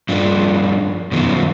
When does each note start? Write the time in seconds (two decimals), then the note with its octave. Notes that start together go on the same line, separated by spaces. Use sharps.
0.09 G2 F3 D4
1.12 F#2 B2 D#3 F3